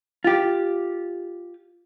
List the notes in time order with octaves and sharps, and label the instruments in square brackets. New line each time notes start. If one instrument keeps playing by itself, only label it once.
[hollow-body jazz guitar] F4 G4